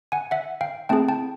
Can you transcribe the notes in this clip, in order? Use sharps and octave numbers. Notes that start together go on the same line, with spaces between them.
F#5 G#5
E5 F#5
F5 G5
A3 C4 E4 G#4 G5 A5
G5 A5